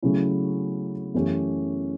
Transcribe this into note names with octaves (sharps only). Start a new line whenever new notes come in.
C#3 F#3 A3 C#4 E4
F#2 E3 A3 C#4 G4